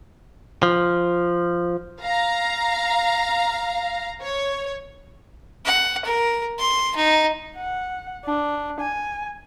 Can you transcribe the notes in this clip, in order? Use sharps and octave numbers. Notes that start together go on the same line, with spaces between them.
F3
F5 A#5
C#5
F#5
A#4
C6
D#4
F#5
D4
G#5